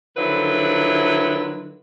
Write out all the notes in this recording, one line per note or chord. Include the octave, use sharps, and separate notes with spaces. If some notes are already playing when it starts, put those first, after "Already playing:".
D3 D#3 F3 F#3 E4 B4